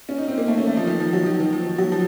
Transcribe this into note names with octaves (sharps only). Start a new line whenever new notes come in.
C#4
D#4
C4
A#3
A3
C#4
A3
F3
D#3
F3
F#3
D#3
D#3
F3
F#3
F3